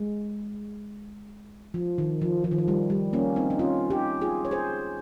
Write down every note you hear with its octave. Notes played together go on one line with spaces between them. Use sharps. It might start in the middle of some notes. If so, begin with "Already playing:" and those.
Already playing: G#3
F3
D#3
F3
F3
D#3
F3
G3
G3
A#3 C#4
C4 D#4
D#4
C#4 F4
D#4 G4
F4 G#4
C#5
G#4 C5